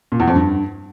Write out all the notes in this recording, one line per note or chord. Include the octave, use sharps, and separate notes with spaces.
A#2
E2
F2
G2